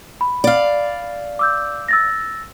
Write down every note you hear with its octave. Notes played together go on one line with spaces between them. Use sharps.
B5
D5 F5
D6 E6 G6
E6 A6 A#6